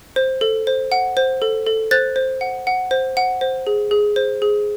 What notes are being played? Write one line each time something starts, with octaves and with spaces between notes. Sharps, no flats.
C5
A4
C5
F#5
C5
A4
A4
C5 F#6 A6
C5
F#5
F#5
C5
F#5
C5
G#4
G#4
C5
G#4